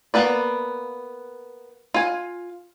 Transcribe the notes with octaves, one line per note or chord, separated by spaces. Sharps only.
A#3 B3 B4 D5
F4 G#5